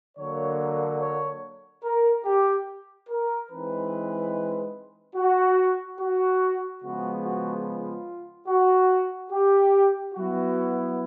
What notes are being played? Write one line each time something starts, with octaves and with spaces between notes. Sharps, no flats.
D3 F#3 A#3 C#5
C#5
A#4
G4
A#4
E3 G#3 C4 D#4 B4
F#4
F#4
C#3 F3 G#3 B3 F#4
F#4
F4
F#4
G4
F#3 B3 E4 F#4